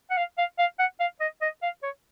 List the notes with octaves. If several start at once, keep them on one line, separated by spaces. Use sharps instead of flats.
F#5
F5
F5
F5
F#5
F5
D#5
D#5
F5
C#5